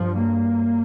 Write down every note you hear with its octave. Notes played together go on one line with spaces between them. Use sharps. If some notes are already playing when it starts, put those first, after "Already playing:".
Already playing: G2 F3
A#3